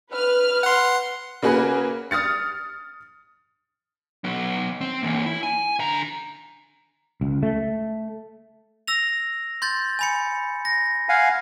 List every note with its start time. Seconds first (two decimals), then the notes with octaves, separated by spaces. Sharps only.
0.12 B4 F6
0.63 F#5 C6
1.42 C#3 A#3 F#4 G#4 B4
2.11 D#6 F6 A6 C#7
4.24 F#3 B3
4.81 C4
5.03 E3 A#3
5.26 E4
5.43 G#5
5.79 D3 A#5
7.21 C#2
7.43 A3
8.88 E6 A#6 F7
9.62 C6 G6 A6
9.99 G#5 B5 C#7
10.65 A#6
11.09 F5 F#5 G#5